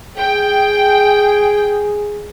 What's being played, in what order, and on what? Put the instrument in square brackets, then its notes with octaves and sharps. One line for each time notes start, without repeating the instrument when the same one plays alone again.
[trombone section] G#4 [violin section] G5